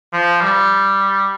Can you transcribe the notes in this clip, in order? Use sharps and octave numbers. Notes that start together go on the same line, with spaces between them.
F3
G3